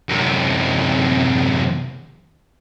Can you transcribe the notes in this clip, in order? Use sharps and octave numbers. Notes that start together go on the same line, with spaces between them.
F#2 C3